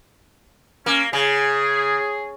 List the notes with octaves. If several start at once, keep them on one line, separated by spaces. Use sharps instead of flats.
A#3 C#4
C#3 G#4